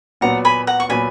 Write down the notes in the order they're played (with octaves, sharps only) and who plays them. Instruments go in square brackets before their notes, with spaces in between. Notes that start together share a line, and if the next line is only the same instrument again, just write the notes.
[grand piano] A#2 F#3 B3 [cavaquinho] F#5 A#5
[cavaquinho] G#5 B5
F#5 A#5
C#6
[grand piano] A#2 F#3 B3 [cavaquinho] G#5 B5